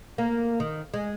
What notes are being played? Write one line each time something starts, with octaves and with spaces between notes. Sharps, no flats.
A#3
D#3
G#3